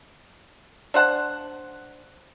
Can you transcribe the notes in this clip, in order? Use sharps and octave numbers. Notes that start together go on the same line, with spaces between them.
D4 C5 F#5 A5